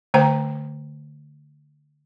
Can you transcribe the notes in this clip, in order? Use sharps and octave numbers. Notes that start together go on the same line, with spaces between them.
D3 A3 C5 G5 A#5